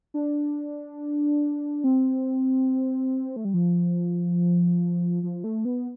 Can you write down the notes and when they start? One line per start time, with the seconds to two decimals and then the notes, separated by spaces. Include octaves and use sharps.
0.14 D4
1.84 C4
3.36 A3
3.45 G3
3.54 F3
5.23 F3
5.44 A3
5.65 B3